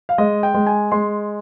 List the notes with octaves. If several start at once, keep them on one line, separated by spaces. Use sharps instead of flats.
F5
G#3 D#5
G5
G#3
G#5
G#3 C6